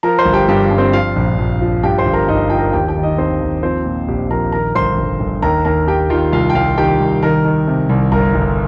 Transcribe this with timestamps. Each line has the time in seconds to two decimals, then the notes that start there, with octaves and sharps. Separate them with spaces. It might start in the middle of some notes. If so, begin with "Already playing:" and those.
0.03 F3 A#4 A#5
0.18 C5 C6
0.25 G1
0.34 G4 G5
0.48 G2 G4
0.71 G2
0.78 C4 C5
0.93 F3 F4 F5
1.16 A#1
1.38 A#1
1.61 F3
1.83 G2 G4 G5
1.98 C5 C6
2.06 G1
2.13 A#4 A#5
2.28 G1 D#4 D#5
2.50 F3 G5
2.58 A#4 A#5
2.73 D#2 G4 G5
2.88 G4 G5
2.96 D#3
3.03 D#4 D#5
3.18 D#2 C4 C5
3.41 D#2
3.62 F3 C4 C5
3.86 A#2
4.08 A#1 G4
4.30 A#1 A#4 A#5
4.52 D#3 A#4 A#5
4.75 G1 C5 C6
4.98 G1
5.20 G1
5.42 D#2 A#4 A#5
5.65 D#2 A#4 A#5
5.87 D#2 G4 G5
6.10 D#3 F4 F5
6.32 C2 F4 F5
6.50 G5
6.54 C2 F4 F5
6.77 D#3 G4 G5
7.00 C2
7.22 D#3 A#4 A#5
7.44 D#3
7.67 C3
7.89 C2
8.12 G1 A#4 A#5
8.35 G1